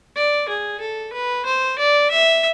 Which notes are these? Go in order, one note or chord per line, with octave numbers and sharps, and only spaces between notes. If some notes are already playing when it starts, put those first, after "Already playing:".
D5
G#4
A4
B4
C5
D5
E5